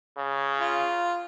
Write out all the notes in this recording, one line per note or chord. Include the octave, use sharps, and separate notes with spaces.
C#3
F4